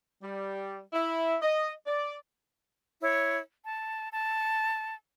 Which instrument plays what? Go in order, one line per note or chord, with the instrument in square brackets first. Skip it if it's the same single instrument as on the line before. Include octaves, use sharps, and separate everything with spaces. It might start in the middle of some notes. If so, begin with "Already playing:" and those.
[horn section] G3
E4
D#5
D5
[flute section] E4 C#5
A5
A5